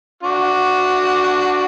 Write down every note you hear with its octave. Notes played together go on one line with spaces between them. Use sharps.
D4 F#4